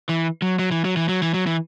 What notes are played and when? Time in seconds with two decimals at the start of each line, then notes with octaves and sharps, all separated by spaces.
0.09 E3
0.42 F#3
0.59 F#3
0.72 E3
0.84 F#3
0.96 E3
1.09 F#3
1.22 E3
1.34 F#3
1.47 E3